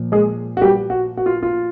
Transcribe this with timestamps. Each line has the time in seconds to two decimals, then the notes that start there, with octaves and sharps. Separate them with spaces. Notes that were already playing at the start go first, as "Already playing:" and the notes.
Already playing: A#2 F3
0.12 G#3 G#4
0.57 F#4
0.61 G3 G4
0.90 F#4
1.17 F#4
1.26 F4
1.43 F4